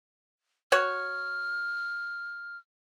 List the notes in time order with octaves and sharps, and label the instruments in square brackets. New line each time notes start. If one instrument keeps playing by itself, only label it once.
[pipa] F#4 C#5 [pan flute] F6